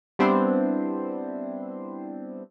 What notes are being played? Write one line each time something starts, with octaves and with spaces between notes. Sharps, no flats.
G3 B3 C4 D4 E4 C5